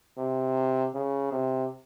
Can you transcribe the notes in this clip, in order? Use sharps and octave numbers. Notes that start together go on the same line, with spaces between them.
C3
C#3
C3